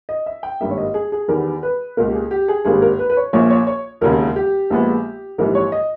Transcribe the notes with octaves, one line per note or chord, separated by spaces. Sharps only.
D#5
E5
G5
G#1 G2 G3 A#3 E5
C#5
D#5
G#4
G#4
E2 D#3 G3 B3 A#4
B4
C#2 B2 A#3 A#4
G4
G#4
G4
G#4
G#1 G2 G3 A#3 G#4
A#4
B4
B4
C#5
A#1 A#2 A#3 C#5
C#5
C#5
E1 D#2 C#3 A#4
G4
A#1 A#2 G#3 B3
A#1 G#2 E3 G3 A#4
C#5
D#5